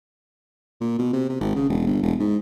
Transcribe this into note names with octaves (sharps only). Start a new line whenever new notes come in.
A#2
B2
C3
C3
G#1
C#3
E1
G1
E1
G#2